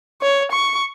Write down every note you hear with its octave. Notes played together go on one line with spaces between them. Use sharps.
C#5
C#6